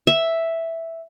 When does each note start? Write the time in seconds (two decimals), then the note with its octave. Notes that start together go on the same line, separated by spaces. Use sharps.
0.07 E5